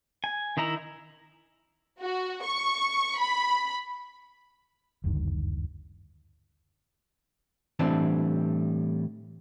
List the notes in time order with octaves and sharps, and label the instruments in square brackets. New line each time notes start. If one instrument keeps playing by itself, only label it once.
[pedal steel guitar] G#5
D#3 D#4 E4 A#5
[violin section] F#4
C#6
B5
[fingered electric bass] F#1 D2 G2 D#3
[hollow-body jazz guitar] A2 E3 G3 C4 D4 A5